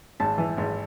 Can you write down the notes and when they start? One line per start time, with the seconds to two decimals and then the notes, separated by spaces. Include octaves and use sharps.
0.20 G#1 A5
0.38 E3
0.57 G#1